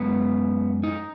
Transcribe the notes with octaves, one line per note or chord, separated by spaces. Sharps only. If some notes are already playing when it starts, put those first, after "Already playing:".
Already playing: F#2 G#3 B3
D#4